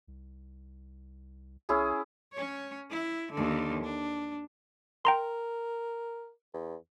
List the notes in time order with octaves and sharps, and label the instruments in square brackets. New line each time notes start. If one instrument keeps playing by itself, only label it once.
[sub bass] C2
[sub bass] B1 [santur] C#4 E4 G#4
[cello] C#4 C#5
E4
D#2 D3
D4
[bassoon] A#4 [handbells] G5 A#5 C6
[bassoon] E2